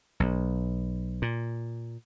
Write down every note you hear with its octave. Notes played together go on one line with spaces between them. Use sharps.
B1
A#2